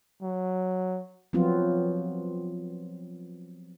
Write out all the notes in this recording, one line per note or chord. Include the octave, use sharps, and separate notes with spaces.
F#3
F3 F#3 B3 C4 F4